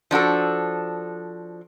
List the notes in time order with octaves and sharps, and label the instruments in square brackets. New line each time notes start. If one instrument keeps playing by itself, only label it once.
[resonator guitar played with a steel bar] F3 D4 F#4 A4